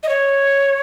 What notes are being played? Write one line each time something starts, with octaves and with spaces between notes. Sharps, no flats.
D#5
C#5